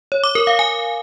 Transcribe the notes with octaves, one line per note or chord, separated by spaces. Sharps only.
C#5
D6
A#4
F5
G#5